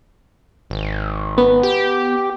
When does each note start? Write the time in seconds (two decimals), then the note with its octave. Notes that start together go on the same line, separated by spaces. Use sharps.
0.70 G#1
1.38 B3
1.63 G4